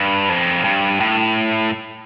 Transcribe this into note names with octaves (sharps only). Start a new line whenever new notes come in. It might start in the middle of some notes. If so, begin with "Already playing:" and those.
Already playing: G2
F2
G2
A2